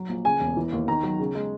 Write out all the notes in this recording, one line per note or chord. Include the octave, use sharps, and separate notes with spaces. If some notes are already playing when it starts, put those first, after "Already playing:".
Already playing: F#3
A#1
C#3 G#5
E1
E3
D#2
D#3 A#5
F#3
C#3
G#3